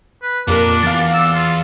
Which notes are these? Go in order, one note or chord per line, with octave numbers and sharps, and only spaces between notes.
B4
F2 A#3 D4 F4 G4 A#4
E2 F5 D6 A6
E6
F4